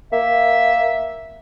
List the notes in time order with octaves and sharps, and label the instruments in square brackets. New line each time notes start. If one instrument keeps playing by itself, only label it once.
[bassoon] A#3 [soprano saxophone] E5